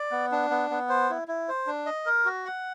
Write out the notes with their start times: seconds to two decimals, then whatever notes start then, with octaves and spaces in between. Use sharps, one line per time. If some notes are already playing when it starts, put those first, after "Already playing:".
Already playing: D5
0.11 B3
0.32 D4
0.50 B3
0.70 B3
0.89 C5
1.10 E4
1.28 E4
1.48 C5
1.67 D4
1.86 D#5
2.06 A#4
2.25 F#4
2.45 F#5